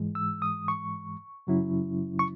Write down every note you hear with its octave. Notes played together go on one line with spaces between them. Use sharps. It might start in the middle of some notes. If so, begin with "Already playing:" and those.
Already playing: G#2 E3 G#3
E6
D#6
C#6
F#2 C#3 F#3 C#4 E4
C#6